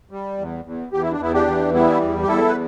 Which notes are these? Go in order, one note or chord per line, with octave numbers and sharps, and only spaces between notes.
G3
E2
E2
E2 G4
E4
D4
E2 B3 E4
D4 G4
E3
G3 B3 E4
E2
G4
E2 E4 A4
B4